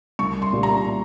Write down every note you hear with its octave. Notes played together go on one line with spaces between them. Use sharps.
C2 C#6
C6
A#2 G3 A#3
A#5